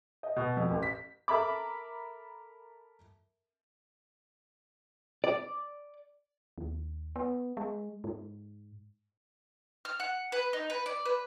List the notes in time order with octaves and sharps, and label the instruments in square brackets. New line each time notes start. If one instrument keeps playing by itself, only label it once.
[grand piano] D#5
B2
F2
A1
B6
[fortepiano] A4 A#4 E5 A5 B5 D6
[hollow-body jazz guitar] D5
[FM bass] D#2
B3
G#3
G#2
[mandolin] F6
F#5
B4
D#4
B4
D5
B4